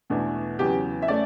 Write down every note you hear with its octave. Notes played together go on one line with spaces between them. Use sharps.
E2 B2 A3 D4
E2 C#3 F#3 B3 G4
E5
A3 C#4 D5